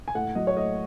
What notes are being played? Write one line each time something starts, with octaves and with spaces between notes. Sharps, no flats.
G#5
A2 F#5
F#3 D#5
C#5
A2 D#5